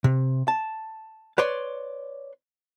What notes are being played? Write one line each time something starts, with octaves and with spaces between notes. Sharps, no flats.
C3
A5
B4 C#5 D5 C6